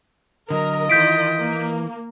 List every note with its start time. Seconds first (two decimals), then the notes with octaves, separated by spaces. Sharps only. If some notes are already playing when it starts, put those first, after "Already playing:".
0.50 D3 F#3 A#4 D#5
0.90 D#3 E3 E4 F4 G6 B6 D7
1.38 A#3